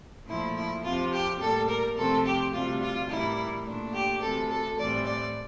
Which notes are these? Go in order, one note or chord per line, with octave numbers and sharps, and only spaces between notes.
A#2 F3 A3 E4
E4
F2 C3 F3 F4
G4
A2 G3 A#3 A4
A#4
F2 C3 F3 A3 C4 A4
G4
D2 C3 G3 F4
F4
A2 E3 G3 A#3 E4
A#2 A3 D4
G4
D2 C3 E3 A4
A4
A2 E3 G3 C4 D5
D5